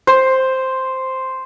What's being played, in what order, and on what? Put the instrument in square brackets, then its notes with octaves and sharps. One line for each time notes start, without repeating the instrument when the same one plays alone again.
[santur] C5